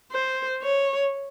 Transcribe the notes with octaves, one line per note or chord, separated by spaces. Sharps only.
C5
C#5